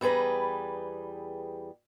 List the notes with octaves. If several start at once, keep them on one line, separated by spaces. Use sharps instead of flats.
E2 G3 G#4 B4 A#5